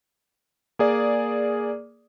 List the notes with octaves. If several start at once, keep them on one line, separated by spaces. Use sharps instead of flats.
A#3 G#4 D5